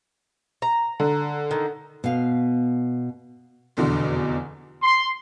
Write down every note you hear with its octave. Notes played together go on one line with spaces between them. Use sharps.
A#5
D3
D#3
B2 F5
F1 E2 B2 D3
C6